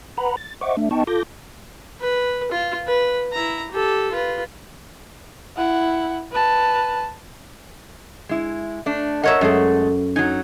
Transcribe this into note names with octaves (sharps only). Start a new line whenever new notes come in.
B4 F#5 A#5 B5
A6
C5 D#5 E5 F#5 C#6 D6
A3 D4 E5
B3 D#4 D#5 G5 A5 C#6
F4 A4 D6 G6 A#6
B4
F4
B4
E4 A#5
G4 A4
F4 B4
E4 F#5
B4 A5
G#3 E4
A3 D4
A#4 C#5 D#5 E5 F#5
F#2 G#3 A3 G#4 A4
F#3 D#4 G#5